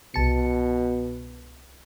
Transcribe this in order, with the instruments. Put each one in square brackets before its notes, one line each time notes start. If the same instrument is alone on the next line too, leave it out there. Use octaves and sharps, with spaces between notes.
[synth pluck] C2 A5 C#7 [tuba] B2